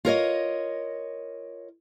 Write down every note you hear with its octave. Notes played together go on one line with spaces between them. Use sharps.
F4 A#4 C#5 D#5